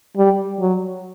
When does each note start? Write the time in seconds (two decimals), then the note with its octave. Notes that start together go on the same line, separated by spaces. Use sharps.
0.17 G3
0.60 F#3